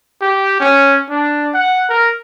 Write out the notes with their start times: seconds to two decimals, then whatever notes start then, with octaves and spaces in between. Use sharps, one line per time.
0.21 G4
0.60 C#4
1.10 D4
1.54 F#5
1.89 A#4